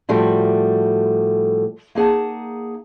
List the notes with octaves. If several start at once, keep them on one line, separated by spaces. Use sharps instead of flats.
A2 F3 G3 A3 F#4
A#3 D#4 G#4 F#5 A5